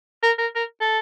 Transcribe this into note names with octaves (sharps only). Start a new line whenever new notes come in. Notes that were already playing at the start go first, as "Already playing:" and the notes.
A#4
A#4
A#4
A4